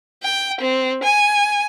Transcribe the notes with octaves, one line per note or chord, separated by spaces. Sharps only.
G5
C4
G#5